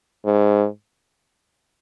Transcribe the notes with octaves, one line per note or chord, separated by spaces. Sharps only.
G#2